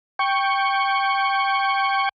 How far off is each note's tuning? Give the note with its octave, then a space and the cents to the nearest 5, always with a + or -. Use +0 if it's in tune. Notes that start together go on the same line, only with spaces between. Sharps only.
G5 +0 C#6 +0